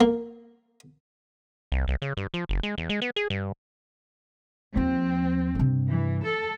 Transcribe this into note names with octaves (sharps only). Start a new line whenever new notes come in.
A#3
C2
C2
C#3
G2
F3
F#1
G#3
E2
G#3
B3
G#4
G2
D#2 F3 C4
G2 C3
E3
A4